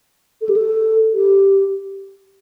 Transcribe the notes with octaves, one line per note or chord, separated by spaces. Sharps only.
A4
G4
A4
G4